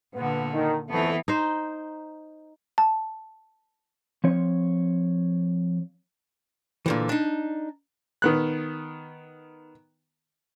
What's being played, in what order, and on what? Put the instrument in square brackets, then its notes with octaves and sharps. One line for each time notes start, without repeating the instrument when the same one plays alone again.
[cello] A#2 D3 [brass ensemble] B3
[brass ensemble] D#3
[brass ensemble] F2 A3 [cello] E3 B3
[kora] D#4 C5
[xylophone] A5
[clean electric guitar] F3 C4 C#5
[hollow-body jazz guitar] A#2 D3 E3
D4 D#4
[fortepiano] D#3 B3 F#6